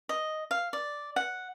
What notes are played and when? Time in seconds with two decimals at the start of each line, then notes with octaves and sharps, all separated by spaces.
0.09 D#5
0.51 F5
0.73 D5
1.16 F#5